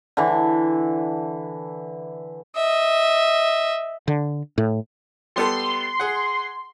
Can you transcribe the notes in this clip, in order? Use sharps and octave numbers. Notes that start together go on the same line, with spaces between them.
D3 E3
D#5 E5
D3
A2
G3 B3 A4 C6
G#4 F#5